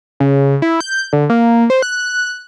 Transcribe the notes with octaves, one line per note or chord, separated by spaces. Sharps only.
C#3
E4
G6
D3
A#3
C5
F#6